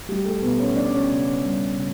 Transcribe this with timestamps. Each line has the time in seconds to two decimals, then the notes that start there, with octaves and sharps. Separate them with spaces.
0.08 G3 A3 G4
0.25 A3 A4
0.42 B2 B3 B4
0.59 C#4 C#5
0.75 A3 D4 D5
0.92 C#4 C#5
1.09 C#3
1.42 G3
1.76 C#3